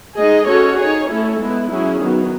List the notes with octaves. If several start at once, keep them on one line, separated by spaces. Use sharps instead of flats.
G#3 D#4 G#4 D#5
C#4 F#4 A4 C#5
D#4 G#4 C#5
A3 C#4 E4 A4
G#3 B3 E4
F#3 C#4 E4 G#4
D#3 F#3 B3